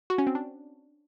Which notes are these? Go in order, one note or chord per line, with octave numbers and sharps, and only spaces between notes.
F#4
C#4
C4
D4